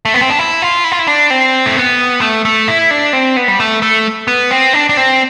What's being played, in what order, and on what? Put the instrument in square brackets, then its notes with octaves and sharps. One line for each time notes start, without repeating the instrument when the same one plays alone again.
[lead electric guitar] A3
B3
C4
D4
E4
F4
E4
F4
E4
D4
C4
A3
B3
A3
A3
E4
D4
C4
B3
G3
A3
A3
B3
C4
D4
D4
C4